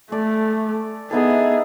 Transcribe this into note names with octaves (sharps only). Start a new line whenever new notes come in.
A3 A4 D5 G#5
B3 D#4 E4 G#4 A4